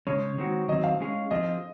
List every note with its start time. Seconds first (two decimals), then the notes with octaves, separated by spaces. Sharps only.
0.07 C#3 G#3 C#4 C#5
0.38 D#3 G#3 C4 F#4
0.68 D#3 F#3 C4 D#5
0.84 F5
1.00 G#3 C#4 G#4
1.30 F3 C4 F4 G#4 D#5